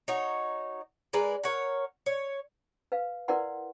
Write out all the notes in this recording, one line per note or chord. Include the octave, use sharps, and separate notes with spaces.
D#4 F#4 C#5
G#3 A#4 B4 D5
A#4 C#5 F#5
C#5
B4 F5
E4 A#4 B4 D5 F#5 C6